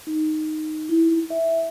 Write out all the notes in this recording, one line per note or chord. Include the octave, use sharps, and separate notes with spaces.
D#4
E4
E5